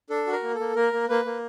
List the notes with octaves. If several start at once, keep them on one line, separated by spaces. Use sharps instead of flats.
D4 A4
F#4
A#4
A#3
A4
A#3
A#3 A#4
A#3
A#3 B4
A#3